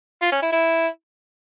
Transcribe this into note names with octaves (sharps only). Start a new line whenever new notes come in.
F4
C#4
E4
E4